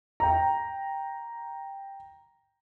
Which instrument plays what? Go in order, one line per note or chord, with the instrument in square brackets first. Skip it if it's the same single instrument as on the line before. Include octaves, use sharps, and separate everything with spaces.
[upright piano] G5 A#5